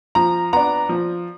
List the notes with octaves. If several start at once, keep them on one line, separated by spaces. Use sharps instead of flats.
F3 A#5
B3 D4 A#5
F3